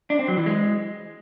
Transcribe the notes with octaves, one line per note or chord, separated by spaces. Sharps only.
D4
C4
F#3
E3
G#3